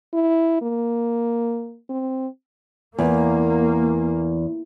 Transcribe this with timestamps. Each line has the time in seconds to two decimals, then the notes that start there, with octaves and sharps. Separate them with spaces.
0.13 E4
0.62 A#3
1.89 C4
2.99 E2 A#3